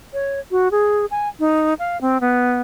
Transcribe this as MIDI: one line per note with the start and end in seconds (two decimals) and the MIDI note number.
0.13 0.40 73
0.51 0.71 66
0.71 1.06 68
1.11 1.28 80
1.40 1.74 63
1.79 2.00 77
2.01 2.18 60
2.21 2.61 59